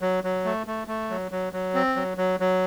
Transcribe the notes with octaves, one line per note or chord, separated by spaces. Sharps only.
F#3
F#3
A3
A3
A3
F#3
F#3
F#3
C4
F#3
F#3
F#3